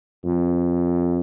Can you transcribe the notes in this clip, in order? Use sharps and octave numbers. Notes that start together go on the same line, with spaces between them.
F2